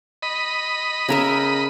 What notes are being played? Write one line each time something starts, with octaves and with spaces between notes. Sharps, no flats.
D#5 B5
C#3 A#4 E5